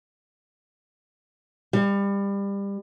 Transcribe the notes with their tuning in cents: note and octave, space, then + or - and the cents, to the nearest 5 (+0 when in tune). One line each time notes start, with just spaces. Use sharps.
G3 +25